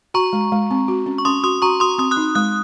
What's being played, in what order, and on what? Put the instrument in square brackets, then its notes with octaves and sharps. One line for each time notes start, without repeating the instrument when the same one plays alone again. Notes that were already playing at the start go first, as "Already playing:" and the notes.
[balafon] F#4 [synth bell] A#5 C#6
[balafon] G#3
G#3
C4
F#4
C#4
[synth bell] C#6
[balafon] C#4 [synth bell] C6 D#6
[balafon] F#4 [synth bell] C6 D#6
[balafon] F#4 [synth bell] A#5 C#6
[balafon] F#4 [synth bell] C6 D#6
[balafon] C4 [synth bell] C6 D#6
[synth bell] D#6 F#6
[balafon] D#4
[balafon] G#3 [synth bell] D#6 F#6